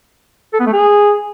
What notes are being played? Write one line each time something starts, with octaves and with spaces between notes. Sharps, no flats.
A4
B3
A3
G#4